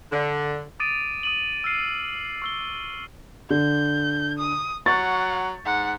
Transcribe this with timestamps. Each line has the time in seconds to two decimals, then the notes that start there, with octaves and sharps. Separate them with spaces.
0.12 D3
0.80 D6 D#6 A6 D7 D#7
1.23 D#6 D#7 F#7
1.64 E6 F6 C7 D#7
2.42 C#6 E6 G7
3.50 D3 G6
4.38 D#6
4.86 F#3 F#5 C#6 A6
5.66 G#2 F#5